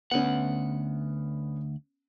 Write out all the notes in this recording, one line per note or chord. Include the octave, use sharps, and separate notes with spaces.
D2 B3 C#4 F#5